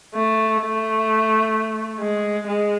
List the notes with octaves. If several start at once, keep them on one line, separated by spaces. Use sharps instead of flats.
A3
A3
G#3
G#3